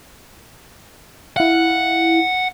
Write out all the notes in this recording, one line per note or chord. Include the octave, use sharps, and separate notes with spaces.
E4 F5 F#5